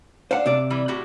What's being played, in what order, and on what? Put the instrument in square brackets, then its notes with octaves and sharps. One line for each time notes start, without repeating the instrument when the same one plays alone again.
[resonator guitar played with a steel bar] D4 F5 [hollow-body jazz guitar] C5 F#5
[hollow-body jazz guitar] C3 D5
[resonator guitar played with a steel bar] E3 G3
A2 F#4 G4